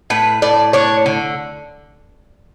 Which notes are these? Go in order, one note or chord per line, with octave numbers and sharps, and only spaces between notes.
A2 B4
A2 D5
D4 C#5
D3